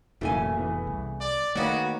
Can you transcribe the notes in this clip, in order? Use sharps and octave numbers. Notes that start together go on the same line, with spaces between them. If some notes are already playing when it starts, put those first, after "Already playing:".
F1 B1 A2 C#3 E3 A3 A#3 G#5
E3 B3 B4
C2
D5 D6
D#3 A3 A#3 F#4 B4 C#5 F5 A6